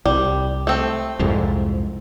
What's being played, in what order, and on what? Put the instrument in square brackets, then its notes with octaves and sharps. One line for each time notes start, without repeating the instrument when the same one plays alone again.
[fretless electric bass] C2 [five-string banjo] G3
[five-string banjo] A3 C4
[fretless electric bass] C2 F2 G#2